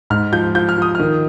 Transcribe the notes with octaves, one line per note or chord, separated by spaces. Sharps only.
G#2 F6
F3 G6
F3 G6
F6
F3 D#6
D#3 F6